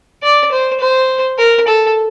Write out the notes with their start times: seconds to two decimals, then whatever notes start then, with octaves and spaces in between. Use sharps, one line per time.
0.23 D5
0.52 C5
0.80 C5
1.39 A#4
1.68 A4